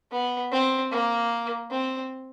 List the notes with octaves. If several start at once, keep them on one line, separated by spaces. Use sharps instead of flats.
B3
C4
A#3
C4